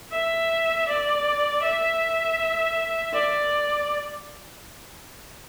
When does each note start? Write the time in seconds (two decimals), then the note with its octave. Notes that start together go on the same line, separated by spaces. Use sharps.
0.12 E5
0.87 D5
1.62 E5
3.14 D5